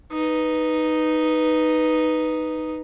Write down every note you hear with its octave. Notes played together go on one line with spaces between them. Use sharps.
D#4 B4